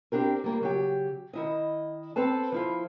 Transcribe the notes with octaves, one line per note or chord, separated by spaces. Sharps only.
C4 D4 G4 A#4
G3 A#3 F4
C#3 F#3 G4
D#3 E4 D#5
C4 A4 B4 A5
F3 E4 F4